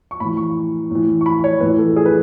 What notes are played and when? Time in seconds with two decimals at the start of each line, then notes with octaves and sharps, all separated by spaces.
0.11 C#6
0.20 A2 E3 B5
0.37 C#6
0.91 A2 E3
1.21 C#6
1.26 B5
1.44 C#5
1.60 A2 E3 B4
1.78 A4
1.92 A4
1.96 G#4
2.06 B4